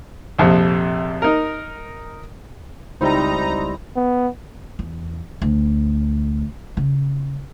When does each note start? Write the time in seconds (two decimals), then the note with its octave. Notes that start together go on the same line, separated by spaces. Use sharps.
0.39 A#1 F2 C3
1.22 D#4 A#4
3.01 C#2 G3 C4 D#4 E4 C5 A#5
3.96 B3
4.79 E2
5.42 D2
6.77 C#3